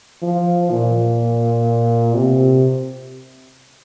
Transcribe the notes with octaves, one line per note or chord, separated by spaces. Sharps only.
F3
A#2
C3